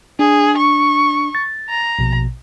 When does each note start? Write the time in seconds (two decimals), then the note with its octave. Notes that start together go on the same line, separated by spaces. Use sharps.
0.19 D4 G#4
0.57 C#6
1.35 A6
1.69 A#5
1.99 A#1 B2